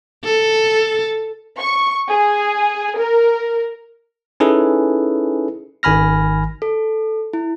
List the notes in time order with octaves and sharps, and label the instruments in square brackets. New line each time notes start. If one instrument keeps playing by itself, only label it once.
[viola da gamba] A4
[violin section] C#6
G#4
A#4
[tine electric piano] C#4 D#4 E4 G#4 A4 B4
G#1 D#3 G#5 B5 F6 A#6
[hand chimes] A4
E4